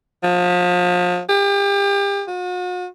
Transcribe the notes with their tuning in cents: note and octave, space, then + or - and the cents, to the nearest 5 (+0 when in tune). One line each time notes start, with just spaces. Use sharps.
F3 +35
G4 +35
F#4 -45